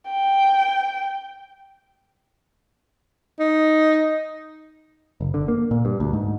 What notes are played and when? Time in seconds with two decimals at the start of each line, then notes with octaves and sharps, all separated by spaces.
0.11 G5
3.40 D#4
5.21 F#1
5.34 D3
5.48 A#3
5.71 A#2
5.85 G2
6.00 D2
6.13 G#2